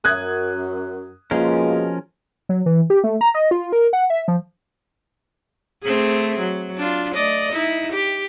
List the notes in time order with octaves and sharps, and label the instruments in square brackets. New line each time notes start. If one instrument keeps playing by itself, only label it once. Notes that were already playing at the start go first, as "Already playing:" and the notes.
[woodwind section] F#2 [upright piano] D#6 F#6 G#6
[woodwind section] B2 G#3 [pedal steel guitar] F3 C#4 A#4 [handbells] A#3 F4
[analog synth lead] F#3
E3
G4
A3
A#5
D#5
F4
A#4
F#5
E5
F3
[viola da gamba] A3 C4 G#4
F#3
D4 F4
A3 D5 D#5
D#4 E4
G4